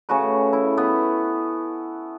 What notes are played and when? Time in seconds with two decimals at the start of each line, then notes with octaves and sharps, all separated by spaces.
0.09 C#3 A3 F#4 B4
0.53 E4
0.78 B3